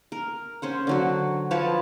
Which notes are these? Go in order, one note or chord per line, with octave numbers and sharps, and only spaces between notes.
A#4
C#4 C5 F#5
D3 F#3 F#4
F3 B4 C#5 A5